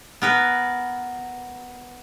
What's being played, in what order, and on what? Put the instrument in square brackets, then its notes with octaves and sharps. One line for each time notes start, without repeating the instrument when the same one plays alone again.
[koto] B3 A#4 B4